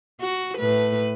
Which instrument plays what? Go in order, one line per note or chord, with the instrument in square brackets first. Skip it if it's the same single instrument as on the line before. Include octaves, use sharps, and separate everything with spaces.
[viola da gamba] F#4
A2 B4